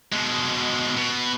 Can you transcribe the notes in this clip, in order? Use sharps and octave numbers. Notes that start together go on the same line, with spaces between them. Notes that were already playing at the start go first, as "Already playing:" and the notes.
B2 G#3
B2